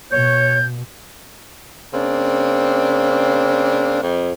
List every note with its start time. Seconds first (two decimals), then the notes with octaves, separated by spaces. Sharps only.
0.11 B2 C#5 G6
1.93 C#3 A#3 C4 D4
4.01 F2